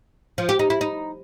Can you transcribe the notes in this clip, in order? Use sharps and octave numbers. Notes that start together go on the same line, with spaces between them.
F3
G4
D#4
E4
D#4